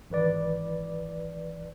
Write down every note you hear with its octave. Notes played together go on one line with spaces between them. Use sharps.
G#1 E3 B4 D5